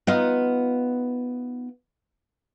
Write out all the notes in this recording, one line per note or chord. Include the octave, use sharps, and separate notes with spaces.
B3 D#4 F4